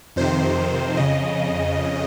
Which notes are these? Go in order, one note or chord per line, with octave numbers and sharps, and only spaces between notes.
F2 C3 D#3 C5
F2 C#3 D#5